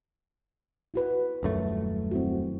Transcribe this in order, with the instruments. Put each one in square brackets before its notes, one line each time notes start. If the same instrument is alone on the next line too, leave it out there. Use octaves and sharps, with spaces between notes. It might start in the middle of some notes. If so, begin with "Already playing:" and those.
[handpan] E4 F#4 B4
[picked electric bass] D#1 F#2 A3
[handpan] C4 E4 F#4